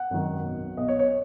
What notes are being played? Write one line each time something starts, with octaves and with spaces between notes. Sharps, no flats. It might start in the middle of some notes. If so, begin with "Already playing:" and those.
Already playing: F#5
G#1 F#2 D#3
B1 B2
B1 B2 D#5
C#5
C#5